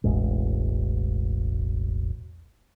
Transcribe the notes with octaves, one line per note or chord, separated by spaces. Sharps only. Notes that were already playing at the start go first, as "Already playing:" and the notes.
E1 A1 G#3